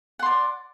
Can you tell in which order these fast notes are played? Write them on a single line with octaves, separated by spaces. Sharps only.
F#5 C6 D5